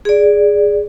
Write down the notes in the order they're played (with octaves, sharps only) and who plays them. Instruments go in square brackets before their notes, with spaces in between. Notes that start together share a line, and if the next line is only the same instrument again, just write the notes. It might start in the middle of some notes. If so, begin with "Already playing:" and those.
[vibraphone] G#4 D5